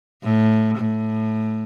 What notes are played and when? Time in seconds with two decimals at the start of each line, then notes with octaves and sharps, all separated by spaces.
0.24 A2
0.77 A2